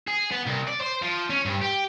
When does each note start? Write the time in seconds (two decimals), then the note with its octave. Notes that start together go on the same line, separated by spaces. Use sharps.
0.08 G#4
0.31 B3
0.46 C2
0.67 D5
0.81 C5
1.02 F3
1.30 C#4
1.46 G2
1.62 G4